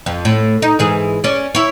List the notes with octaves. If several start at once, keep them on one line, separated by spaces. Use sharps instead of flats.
F2
A2
D#4
G#2 E3 G#4
C#4 D5
E4 C#5